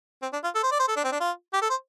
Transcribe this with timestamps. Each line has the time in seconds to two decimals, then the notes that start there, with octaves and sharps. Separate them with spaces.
0.22 C4
0.33 D4
0.44 F4
0.55 A4
0.63 C5
0.72 D5
0.79 C5
0.88 A4
0.96 D4
1.04 C4
1.12 D4
1.20 F4
1.53 G4
1.62 A4
1.70 C5